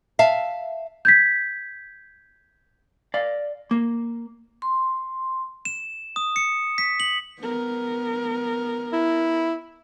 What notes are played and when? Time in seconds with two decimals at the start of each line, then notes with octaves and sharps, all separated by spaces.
0.19 E5 F5 A5
1.05 G6 G#6 B6
3.14 D5 F5
3.71 A#3
4.62 C6
5.65 E7
6.16 D#6
6.36 C#7
6.78 B6
7.00 F#7
7.39 B3 A#4
8.93 E4